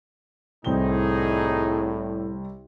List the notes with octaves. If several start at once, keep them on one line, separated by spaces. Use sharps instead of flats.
C2 A2 C4 D#4 G#4 G7